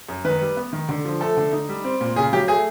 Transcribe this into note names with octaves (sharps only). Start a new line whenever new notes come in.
F#2
D#3 B4
G3
B3
D#3
D3
F3
A3 A4
D3
D#4
G3
C4
A#2
C#3 G#4
F#3 G4
A3 G#4